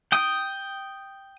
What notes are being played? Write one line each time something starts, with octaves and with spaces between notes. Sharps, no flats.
G5 D#6